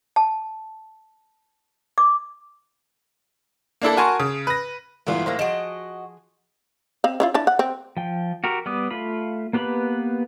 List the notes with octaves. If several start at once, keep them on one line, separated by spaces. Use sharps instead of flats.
A5
D6
A#3 D4 E4 A4
F#4 A#4 G#5 A5 C6 C#6
C#3
B4 A#6
G#1 G2 E3 A3 B3 F4
A2 G#3 A#3 C5
F3 F#4 G#4 D#5 D7 E7
C4 F5
C#4 E4 F4
D4 E4 A5
F#5
C4
F3 G5
F#4 G4 A#4
G3 B3 D6 D#6
A3 F4 F5 B5
A#3 B3 G4 B4 B5